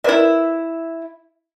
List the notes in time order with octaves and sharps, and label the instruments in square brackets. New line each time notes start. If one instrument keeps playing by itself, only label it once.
[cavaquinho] E4 E5 [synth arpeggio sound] A#4 B4 D5